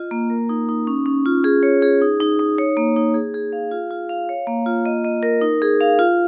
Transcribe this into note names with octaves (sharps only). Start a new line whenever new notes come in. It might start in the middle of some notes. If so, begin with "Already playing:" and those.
Already playing: F4 D#5
A#3
A#4
D#4
D#4
C#4
C#4
F4
G#4
C#5
G#4
D#4
D#4
D#4
C#5
A#3
D#4
G#4
G#4
F5
F4
F4
F5
C#5
A#3
F4
D#5
D#5
A#4
D#4
G#4
F5
F4